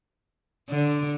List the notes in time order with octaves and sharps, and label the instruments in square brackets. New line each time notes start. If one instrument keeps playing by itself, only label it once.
[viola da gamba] D3